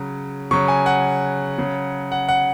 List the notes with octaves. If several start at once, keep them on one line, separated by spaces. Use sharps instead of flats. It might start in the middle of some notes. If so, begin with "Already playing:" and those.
Already playing: C#3 F#3
C#3 F#3 C#6
G#5
F#5
C#3 F#3
F#5
F#5